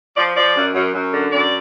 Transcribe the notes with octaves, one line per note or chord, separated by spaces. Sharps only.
F3 D5
F3 D5
F#2
F#2
F#2
D3
F#2 D5